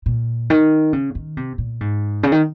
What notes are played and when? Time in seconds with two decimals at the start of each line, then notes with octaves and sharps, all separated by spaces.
0.06 A#2
0.50 D#3
0.93 C#3
1.15 D#3
1.37 C3
1.58 A#2
1.81 G#2
2.23 C#3
2.32 D#3